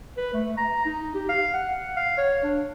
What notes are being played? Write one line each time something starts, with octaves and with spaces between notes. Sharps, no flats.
B4
A3
A#5
D#4
G4
F5
F#5
F5
C#5
D4